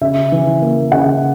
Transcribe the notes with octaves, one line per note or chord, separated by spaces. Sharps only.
C#3 E5
E3
A#3
C#3 F#5